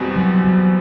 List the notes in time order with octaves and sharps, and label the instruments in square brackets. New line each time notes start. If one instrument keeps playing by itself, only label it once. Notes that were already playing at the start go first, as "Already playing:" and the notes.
Already playing: [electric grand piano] E2 B2 G3 C4 F#4
[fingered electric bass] F#3
F#3